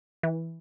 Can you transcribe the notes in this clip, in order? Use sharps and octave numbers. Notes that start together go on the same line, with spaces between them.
E3